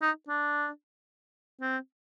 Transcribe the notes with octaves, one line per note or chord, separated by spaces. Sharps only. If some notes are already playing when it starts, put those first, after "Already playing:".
D#4
D4
C4